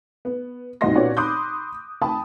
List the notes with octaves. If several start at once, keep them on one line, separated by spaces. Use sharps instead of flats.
B3
C2 G#2 B2 D#5 C6 A#6
A#2 B3 C#4 F#4 C#5 D5
B5 C6 D6 D#6 F#6 G6
G5 A5 B5 D#6